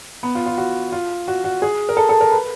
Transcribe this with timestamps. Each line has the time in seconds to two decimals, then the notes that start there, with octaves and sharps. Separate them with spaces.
0.23 B3
0.35 F4
0.46 F4
0.58 F#4
0.92 F4
1.28 F#4
1.44 F#4
1.62 G#4
1.89 A#4
1.97 A4
2.09 A4
2.21 A#4
2.32 B4